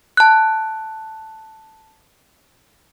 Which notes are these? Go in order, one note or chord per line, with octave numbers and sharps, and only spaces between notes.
A5 F#6